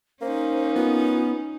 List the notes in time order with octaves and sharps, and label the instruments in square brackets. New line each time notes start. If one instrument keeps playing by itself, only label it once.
[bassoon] A#3 [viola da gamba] C#4 D#4 [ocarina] C5
[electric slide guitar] B3 [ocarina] F4